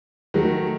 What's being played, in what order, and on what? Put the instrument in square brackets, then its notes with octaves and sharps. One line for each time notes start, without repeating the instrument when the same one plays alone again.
[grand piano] D#3 F#3 A3